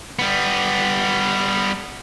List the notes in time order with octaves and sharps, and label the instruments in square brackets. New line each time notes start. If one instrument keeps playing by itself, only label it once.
[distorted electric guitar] G3 B3